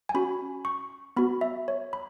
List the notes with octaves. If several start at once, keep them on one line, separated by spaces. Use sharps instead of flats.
G#5
C#4 F#4 B5
C#6
B3 F#4 B5
E5
C#5
B5